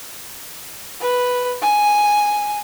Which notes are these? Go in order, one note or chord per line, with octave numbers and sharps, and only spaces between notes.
B4
G#5